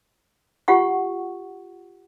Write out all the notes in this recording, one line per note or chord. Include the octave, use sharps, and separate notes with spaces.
F4 G4 F#5 C#6